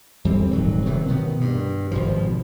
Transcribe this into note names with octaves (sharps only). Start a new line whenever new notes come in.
F2 E3 G3 C4
D#1 G#2 F#3
C3 D#3 E3 F#3
B2 D#3 B3
G2
G#1 B2 F3